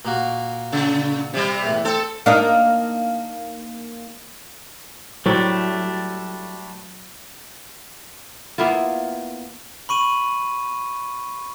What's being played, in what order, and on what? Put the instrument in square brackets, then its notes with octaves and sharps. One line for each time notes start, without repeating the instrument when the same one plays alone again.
[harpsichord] A#2 A#3 F#4
[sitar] C#3
C3 G3
[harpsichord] E2 A2
[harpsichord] C4 [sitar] A4
[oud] A#3 D4 D#4
[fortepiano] A2 C5 C#5 [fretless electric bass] F#3 [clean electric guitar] G3 A3 D4
[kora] A#3 B3 E4 F4
[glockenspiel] B5 C#6 D#7